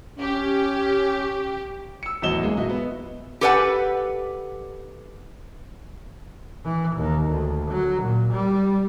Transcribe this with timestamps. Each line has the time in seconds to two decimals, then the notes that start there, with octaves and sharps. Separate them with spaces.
0.18 C#4 G4
2.03 E6 C#7
2.22 D1 E2 F#3 D#5 E7 G7
2.43 G#3 A#3
2.57 A#2 F#4 D#5 E5
2.69 B3
3.41 G4 A4 B4 D5 F#5 G#5
6.65 E3
6.96 D#2
7.30 D2
7.71 F#3
8.03 A#2
8.33 G3